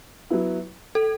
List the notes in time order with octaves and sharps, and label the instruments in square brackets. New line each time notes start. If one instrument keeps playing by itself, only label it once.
[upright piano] F#3 B3 E4
[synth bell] A4